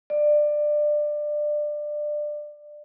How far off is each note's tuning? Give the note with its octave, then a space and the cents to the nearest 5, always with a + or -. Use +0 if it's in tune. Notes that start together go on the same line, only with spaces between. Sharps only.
D5 +20